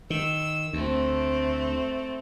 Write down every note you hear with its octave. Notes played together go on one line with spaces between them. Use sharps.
D#3 E6
D2 A3 C4